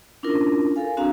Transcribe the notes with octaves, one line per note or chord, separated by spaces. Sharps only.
C#4 D4 E4 F4 A#4
A4 A#4 F5 G#5
C4 D4 F#4 G#4 F5 A#5